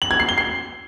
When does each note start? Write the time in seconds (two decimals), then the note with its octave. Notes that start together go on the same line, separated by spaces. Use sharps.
0.02 F#7
0.11 G#6
0.20 C7
0.29 G7
0.38 C7